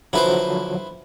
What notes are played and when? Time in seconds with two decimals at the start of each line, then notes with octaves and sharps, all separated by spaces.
0.13 D3 F3 F#3 E4 B4 C5